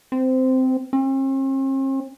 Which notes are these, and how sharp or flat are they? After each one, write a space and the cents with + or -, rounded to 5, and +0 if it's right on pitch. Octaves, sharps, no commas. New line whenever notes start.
C4 -15
C4 +45